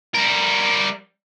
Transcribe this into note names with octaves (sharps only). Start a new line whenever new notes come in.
G3 A#4